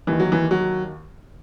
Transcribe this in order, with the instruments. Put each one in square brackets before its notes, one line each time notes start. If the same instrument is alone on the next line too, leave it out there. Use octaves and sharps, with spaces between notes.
[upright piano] D#2 D#3 E3
F#3
E3
F#3